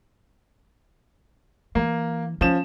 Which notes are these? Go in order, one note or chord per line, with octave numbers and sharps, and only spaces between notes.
E3 A#3
F3 C#4 E7